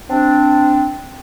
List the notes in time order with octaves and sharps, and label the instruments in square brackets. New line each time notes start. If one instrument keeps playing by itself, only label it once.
[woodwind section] C4 D4